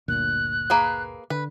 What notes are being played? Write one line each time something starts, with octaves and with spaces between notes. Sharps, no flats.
G1 D2 A#2 F#6
A#3 G#4 B4
D3 B4